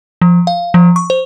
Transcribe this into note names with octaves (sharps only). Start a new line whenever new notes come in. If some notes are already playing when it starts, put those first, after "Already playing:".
F3
F5
F3
C#6
C5